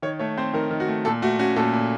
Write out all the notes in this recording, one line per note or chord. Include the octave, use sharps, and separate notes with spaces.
D#3 C#5
A3 C#5
C4 C5
D#3 A#4
D#3
F#4
A3
A#2 A4
A3 F#4
C#4 F#4
A#2 A4
A#2